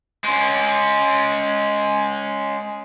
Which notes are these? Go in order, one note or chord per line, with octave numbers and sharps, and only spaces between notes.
G#3 C#4